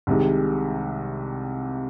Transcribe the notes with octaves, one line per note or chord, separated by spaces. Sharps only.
C2 C3 D#3 G#3